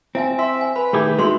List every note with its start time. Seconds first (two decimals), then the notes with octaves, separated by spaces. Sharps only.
0.15 C4 E4 E5 G#5
0.39 E5 C6
0.61 G#5
0.76 B4 B5
0.93 D#3 A3 E4 G4 G#4
1.19 G#3 A3 D#4 F#4 C6